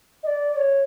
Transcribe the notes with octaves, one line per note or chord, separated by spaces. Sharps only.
D#5
D5
D5
C#5